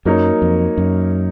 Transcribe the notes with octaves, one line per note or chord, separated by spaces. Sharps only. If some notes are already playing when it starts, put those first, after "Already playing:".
F#2 F#3 A#3 D#4 A#4 C#5
F2
F#2